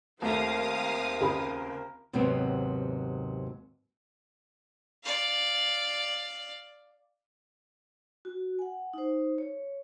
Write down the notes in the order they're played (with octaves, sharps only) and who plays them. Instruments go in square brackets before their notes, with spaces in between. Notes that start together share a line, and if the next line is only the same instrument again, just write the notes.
[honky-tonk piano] D#2 E5 [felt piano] A3 [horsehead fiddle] C4 A#4 [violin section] F5 D#6
[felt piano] C#2 G#4 B5
[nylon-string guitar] D#2 G#2 C3 F#3 B3 C4
[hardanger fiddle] D5 F5
[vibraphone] F#4
F#5 G#5
D#4 C5
C#5